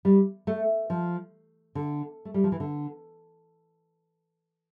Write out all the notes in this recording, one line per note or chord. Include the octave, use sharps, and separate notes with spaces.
G3
A3
F3
D3
A3
G3
F3
E3
D3